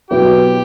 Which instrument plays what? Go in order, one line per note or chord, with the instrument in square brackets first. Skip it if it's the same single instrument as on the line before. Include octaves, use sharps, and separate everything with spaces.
[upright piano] B2 F#3 B3 E4 [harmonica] G4